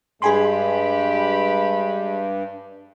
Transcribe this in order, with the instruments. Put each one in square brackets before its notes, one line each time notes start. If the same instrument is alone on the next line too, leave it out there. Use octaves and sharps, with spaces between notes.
[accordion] G2 [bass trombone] G#3 [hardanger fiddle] G4 B5 [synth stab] G#4 G#5 C6